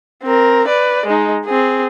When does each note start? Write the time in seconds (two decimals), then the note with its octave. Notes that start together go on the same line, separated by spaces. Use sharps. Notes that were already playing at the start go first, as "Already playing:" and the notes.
0.23 C4 A#4
0.67 B4 D5
1.06 G#3 D#4
1.45 C4 G#4